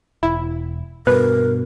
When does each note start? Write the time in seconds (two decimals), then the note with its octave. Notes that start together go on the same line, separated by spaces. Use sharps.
0.23 E1 E4
1.07 G2 B2 A#4 B4